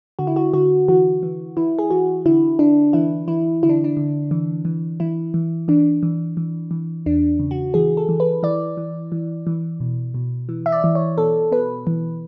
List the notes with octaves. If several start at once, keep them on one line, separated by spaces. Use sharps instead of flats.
D3 F#4
E4
F#4
D3 F#4
E3 F#4
E3
E3 E4
G#4
E3 F#4
D3 E4
D3 D4
E3 E4
E3 E4
D3 E4
D4
D4
D3
E3
E3
E3 E4
E3
E3 D4
E3
E3
E3
E2 D4
C#3
F#4
E3 G#4
A4
E3
B4
E3 D5
E3
E3
E3
B2
B2
E3
E5
D5
E3
C#5
B2 A4
B2 B4
E3